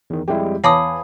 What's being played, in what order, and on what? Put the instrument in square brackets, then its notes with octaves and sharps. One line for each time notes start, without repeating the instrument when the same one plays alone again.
[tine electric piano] E2 D#3
[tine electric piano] F2 G3 G#3 [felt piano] E4 G4
[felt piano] E2 [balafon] C#5 A5 D6 [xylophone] F5 B5 D#6 [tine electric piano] G#5